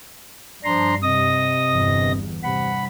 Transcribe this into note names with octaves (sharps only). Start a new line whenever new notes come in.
G2 F3 D4 A#5 C6
C3 D#5 D#6 A#6
G1 E2 G2
G2 C3 F#5 B5